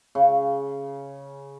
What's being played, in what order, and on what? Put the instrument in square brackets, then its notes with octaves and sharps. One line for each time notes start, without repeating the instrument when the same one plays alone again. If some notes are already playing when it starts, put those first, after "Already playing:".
[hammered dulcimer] C#3